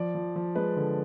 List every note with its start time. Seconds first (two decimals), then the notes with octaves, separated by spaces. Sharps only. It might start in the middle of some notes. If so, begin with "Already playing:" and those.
Already playing: F3 D5
0.15 F3
0.36 F3
0.56 G#3 B4
0.76 D3